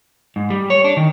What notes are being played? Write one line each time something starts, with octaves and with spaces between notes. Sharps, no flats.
G#2
G3
C#5
D4
D#3